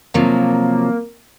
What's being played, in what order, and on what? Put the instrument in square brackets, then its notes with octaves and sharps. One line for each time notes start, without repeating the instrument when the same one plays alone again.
[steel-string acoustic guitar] C3 F3 F#3 [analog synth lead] A#3